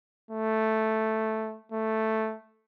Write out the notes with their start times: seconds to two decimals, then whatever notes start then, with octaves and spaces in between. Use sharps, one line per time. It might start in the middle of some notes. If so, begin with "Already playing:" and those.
0.31 A3
1.72 A3